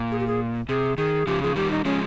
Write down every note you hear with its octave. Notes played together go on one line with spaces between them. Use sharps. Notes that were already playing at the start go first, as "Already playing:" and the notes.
Already playing: A#2
G#4
G4
G#4
C3 G#4
D#3 G#4
C#3 F3 G4
F3 G#4
D#3 G3 G4
D#4
F3 G#3 C#4